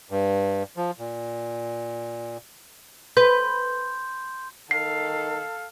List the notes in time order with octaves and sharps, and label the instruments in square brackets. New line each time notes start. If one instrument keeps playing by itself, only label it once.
[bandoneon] G2
F3
A#2
[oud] B4 [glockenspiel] C6 G6
[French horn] D#3 [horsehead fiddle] A4 [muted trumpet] F5 [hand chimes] C7